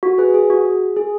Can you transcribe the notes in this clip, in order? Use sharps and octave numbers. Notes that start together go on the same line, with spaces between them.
F#4
G#4 B4
G#4
F#4
G#4
G#4